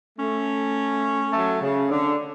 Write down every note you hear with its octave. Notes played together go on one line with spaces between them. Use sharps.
A3 C#4
F#3 A3
C#3
D3